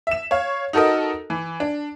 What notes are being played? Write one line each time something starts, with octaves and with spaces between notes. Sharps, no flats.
E5 E7
C#5 F5
D#4 F#4 A4 A#4 D#5
E3
D4